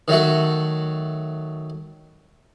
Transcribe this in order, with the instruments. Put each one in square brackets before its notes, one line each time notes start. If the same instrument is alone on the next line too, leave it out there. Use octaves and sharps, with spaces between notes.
[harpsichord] D#3 F#3 A3 F#4